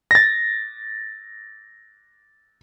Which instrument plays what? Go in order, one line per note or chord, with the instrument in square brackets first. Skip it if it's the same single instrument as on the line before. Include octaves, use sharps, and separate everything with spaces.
[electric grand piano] A6 A#6